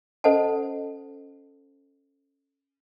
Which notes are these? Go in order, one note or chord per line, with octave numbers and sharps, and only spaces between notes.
C#4 A4 C5 D#5 F#5 A5